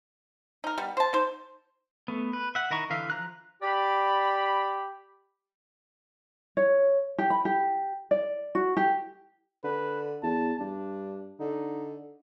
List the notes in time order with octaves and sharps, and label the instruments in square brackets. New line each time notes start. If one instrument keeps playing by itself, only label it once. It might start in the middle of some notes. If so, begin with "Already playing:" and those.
[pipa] D#4 A#4
G3 B3
C5 A5
D#4 C5
[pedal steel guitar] A3 B3
B4
E5 F#5
D#3 E4 D#5 A#5 C#6
D3 E3 E5 F5
F3 A#5 F#6
[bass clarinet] G4 [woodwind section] D5 B5
[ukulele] C#5
G4
B5
G4
D5
F#4
G4
[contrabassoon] D3 [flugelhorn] B4
[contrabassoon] E2 [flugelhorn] A5
[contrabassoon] G2 [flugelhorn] D4
[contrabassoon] D3 [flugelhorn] D#4